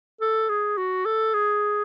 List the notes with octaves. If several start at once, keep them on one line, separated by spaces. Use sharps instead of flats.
A4
G#4
F#4
A4
G#4